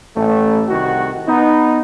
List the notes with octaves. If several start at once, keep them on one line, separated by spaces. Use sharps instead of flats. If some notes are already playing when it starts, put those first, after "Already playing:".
A1 A3
C2 D#3 F#4
B3 D#4